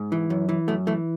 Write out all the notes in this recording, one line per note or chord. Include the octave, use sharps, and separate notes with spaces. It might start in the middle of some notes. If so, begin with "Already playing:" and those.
Already playing: G#2
E3
F#2
E3
F#2 A3
E3 A3